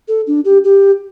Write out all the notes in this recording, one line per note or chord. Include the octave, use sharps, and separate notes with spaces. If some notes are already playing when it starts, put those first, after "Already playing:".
A4
D4
G4
G4